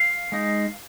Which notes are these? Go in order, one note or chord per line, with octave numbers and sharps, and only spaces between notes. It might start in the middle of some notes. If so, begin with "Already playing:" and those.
Already playing: F5
G#3 D#4